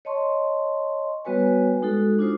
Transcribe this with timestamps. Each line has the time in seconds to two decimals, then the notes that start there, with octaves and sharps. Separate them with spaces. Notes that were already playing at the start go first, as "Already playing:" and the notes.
0.05 C#5 D#5 A5 C6 C#6
1.25 G3 B3 F#4 B4 C#5 G#5
1.82 G#3 D#4 F#4 A4
2.19 D4 F4 C5 D#6